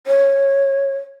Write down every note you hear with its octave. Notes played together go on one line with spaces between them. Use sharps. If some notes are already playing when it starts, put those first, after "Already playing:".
C#5